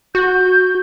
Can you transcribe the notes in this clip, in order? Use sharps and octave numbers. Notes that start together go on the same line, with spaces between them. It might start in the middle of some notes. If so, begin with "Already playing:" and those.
F#4 G6